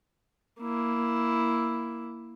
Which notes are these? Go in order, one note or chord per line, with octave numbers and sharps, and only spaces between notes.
A#3 E4